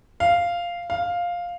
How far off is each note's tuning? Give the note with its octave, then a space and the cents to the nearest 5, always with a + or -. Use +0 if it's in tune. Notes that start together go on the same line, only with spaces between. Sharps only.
F5 -5
F5 +5